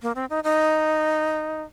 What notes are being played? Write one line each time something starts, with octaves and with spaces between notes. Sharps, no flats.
A#3
C4
D#4
D#4